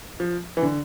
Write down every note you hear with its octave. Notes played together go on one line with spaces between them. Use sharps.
F3
E3
D3